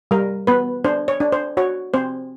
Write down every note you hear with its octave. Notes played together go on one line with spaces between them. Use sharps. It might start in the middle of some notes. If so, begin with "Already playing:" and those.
G3 A#4
B3 B4
D4 C5
C#5
D4
C5
F#4 C#5
C4 C5